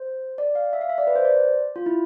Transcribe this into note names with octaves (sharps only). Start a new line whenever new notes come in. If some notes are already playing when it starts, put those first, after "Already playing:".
Already playing: C5
D5
F5
E5
F5
E5
D5
B4
C5
D5
F4
E4